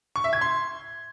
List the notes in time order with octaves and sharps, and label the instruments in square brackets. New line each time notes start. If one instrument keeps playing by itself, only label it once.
[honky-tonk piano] C#6
E5
G#6
C6